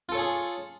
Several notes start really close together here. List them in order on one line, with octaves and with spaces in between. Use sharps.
F4 A4 C#5 G#4